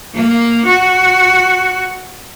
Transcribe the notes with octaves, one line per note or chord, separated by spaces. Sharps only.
A#3
F#4